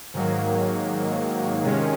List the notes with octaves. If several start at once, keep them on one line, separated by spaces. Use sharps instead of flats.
G#2 D#3 F#3 A#3
C3 D#3 G#3 C#4